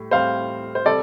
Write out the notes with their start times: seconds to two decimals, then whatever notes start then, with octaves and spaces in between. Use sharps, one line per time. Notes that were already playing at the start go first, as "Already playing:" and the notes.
Already playing: A2 G3
0.11 A2 G3 C4 C5 F5
0.75 C5
0.85 C3 G3 C4 A4 D5